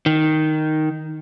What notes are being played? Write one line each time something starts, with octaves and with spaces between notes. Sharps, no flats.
D#3